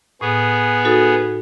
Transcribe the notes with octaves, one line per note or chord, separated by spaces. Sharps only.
A2 B3 G#4
D#4 F#4 A4